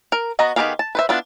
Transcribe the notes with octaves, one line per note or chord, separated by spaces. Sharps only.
A#4
B3 F#4 D#5 A#5
D#3 B3 G4 G#4 F5
A5
B4 C5 E5
B3 D4 E4 F4